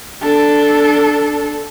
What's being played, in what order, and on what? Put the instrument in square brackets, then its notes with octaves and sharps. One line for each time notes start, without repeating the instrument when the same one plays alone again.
[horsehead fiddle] D4 A4